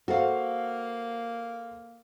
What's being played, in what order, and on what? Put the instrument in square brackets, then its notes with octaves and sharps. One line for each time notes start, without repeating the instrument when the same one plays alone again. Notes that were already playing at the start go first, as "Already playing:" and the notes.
[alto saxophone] A#3 [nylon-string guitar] F#4 [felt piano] A4 C5 F5